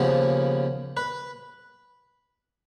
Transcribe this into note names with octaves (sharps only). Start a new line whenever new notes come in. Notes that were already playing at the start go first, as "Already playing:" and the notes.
Already playing: D#2 C#3 F3 B3
B4